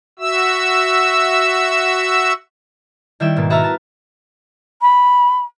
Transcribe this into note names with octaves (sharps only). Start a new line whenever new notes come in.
F#4 E5 E6
D#3 G3 E4 G5 E7
G#2 B2 A#3
F#4 B4 E5 A5 A#5 F6
A5
B5